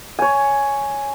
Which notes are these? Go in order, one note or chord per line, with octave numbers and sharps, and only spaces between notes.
C#5 G#5